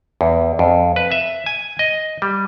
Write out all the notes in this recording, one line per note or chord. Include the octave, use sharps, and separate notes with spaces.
E2
F2
B4
E5
G#5
D#5
G3